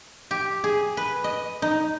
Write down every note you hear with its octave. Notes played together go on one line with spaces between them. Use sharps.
G4
G#4
B4
D#5
D#4